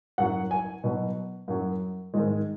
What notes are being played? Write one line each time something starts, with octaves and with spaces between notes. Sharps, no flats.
F#2 F#3 F#5
G#5
B2 F#3
F#2 F#3
G#2 D#3 G#3